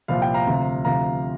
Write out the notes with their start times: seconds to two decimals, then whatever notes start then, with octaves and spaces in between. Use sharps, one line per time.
0.08 C2 A#2 F3 F5
0.22 G5
0.34 F5 A#5
0.47 D2 C3 F3
0.85 D2 C3 F3 F5 A#5